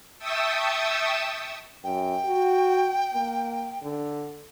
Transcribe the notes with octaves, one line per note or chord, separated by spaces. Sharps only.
E5 G5 A5 C#6 D#6 E6
F#2 G5
F#4
A#3
D3